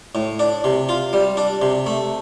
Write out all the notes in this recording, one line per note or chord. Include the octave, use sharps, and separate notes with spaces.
A2
D4
C3
F4
G3
D4
C3
A3